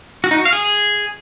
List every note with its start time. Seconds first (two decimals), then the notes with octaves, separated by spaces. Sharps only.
0.24 F#4
0.31 D#4
0.38 F#4
0.45 F5
0.53 G#4